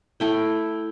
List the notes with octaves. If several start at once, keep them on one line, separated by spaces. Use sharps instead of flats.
A3 E4 G5